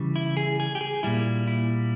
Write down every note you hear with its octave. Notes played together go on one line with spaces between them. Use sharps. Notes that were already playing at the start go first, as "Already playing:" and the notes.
Already playing: C#3 E3 G3
E4
G#4
G#4
G4
G#4
A#2 G3 E4
E4